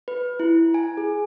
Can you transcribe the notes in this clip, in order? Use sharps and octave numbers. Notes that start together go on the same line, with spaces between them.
B4
E4
G#5
G#4